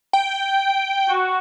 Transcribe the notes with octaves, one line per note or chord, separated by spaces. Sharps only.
G5
F#4